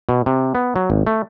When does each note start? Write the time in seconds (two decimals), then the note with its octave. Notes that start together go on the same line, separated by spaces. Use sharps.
0.09 B2
0.26 C3
0.55 B3
0.76 F#3
0.90 G#1
1.07 A3